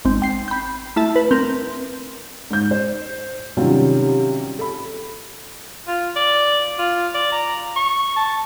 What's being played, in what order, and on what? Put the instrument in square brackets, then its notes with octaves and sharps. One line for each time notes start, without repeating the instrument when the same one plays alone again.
[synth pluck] G#1 C4
G5 C7
B5 G6
A3 E4 E5 A5
B4
C4 A#4
[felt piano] G#2 G6
C5
C3 D#3 F#3 G3 C#4 F4
A4 B5
[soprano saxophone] F4
D5
F4
D5
A#5
C#6
A5